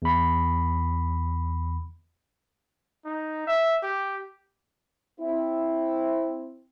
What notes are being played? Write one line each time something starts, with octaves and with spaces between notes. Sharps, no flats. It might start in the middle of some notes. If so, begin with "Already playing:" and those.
E2 B5
D#4
E5
G4
C4 E4